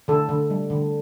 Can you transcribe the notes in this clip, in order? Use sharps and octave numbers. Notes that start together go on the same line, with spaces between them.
D3 A4
D3
G3
D3